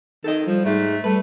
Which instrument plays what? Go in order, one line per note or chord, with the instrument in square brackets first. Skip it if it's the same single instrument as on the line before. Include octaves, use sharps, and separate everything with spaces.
[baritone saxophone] D#3 [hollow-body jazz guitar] A4 D#5
[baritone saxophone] F3 [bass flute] G3
[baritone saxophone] G#2 [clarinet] A3
[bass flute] G3 [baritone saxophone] A3 [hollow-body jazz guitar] B4